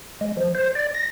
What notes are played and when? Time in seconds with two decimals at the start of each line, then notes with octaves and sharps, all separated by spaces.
0.21 G#3
0.37 F3
0.55 C5
0.75 D5
0.94 A#6